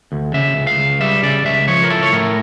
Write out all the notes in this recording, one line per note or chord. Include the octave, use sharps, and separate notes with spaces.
D2
C#3 E5
C#2
F5
C#2
G3 E5
C#3 D5
C#2 E5
F3 C#5
A#4
E4 A4
C#5
A2 A#4